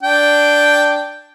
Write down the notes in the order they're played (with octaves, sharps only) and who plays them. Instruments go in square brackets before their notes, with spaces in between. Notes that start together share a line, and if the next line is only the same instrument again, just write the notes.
[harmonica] D4 G5